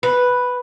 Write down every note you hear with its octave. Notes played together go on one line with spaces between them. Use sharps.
B4